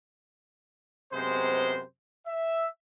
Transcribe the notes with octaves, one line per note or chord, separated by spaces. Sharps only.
F#2 C3 G#3 B3 C5
E5